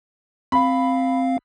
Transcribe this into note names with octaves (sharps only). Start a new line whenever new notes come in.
C4 F5 B5